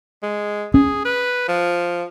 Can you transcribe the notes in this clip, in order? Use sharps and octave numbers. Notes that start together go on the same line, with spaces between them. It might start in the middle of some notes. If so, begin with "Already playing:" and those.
G#3
C#4 G#4
B4
F3